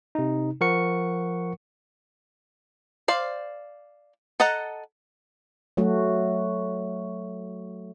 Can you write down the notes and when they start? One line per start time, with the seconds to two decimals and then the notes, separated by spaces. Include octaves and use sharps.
0.15 C3 D#4
0.61 F3 A#4 F#5 C#6 C#7
3.08 C5 D5 F5
4.40 A4 D#5 F#5 A5 A#5
5.77 F#3 A3 F#4